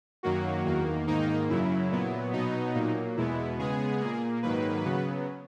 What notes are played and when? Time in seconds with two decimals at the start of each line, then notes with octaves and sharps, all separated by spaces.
0.23 F#2 D#3 F#3 A#3 F#4
0.65 E2 D#3 A#3
1.07 G#2 D#3 A#3 D#4
1.49 F#2 C#3 F#3 E4
1.91 A#2 F#3 B3
2.33 B2 F#3 B3 D#4
2.75 A#2 F#3 A#3
3.17 E2 B2 G#3 B3 E4
3.59 C#3 G#3 B3 G#4
4.00 A#2 A#3
4.43 G#2 D#3 F#3 A#3 B4
4.85 C#3 F#3 B3